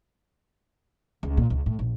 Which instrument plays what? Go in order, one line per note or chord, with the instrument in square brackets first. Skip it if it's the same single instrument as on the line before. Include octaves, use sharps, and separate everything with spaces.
[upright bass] C#2
A#2
C#2
A2
A#1